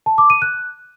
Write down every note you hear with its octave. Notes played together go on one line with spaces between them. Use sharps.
A5
D6
D#7
F#6